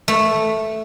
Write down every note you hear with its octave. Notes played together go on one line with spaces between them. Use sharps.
A3